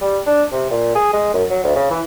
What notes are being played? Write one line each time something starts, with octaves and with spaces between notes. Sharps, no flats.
G3
D4
C3
A#2
G#4
G#3
F#2
F#3
D2
C#3
E3